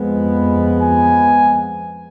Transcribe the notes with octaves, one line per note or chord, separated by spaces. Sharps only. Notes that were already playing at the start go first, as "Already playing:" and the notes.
Already playing: F2 F3 G#3 B3
G#5